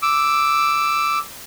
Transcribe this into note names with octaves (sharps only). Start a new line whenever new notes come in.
D6 E6